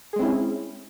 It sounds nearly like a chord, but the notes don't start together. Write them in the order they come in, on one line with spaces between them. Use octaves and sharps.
G#4 G#3 C4 E4 C#4